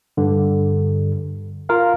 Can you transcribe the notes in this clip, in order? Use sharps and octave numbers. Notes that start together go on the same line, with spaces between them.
G2 D3
F4 A#4 F5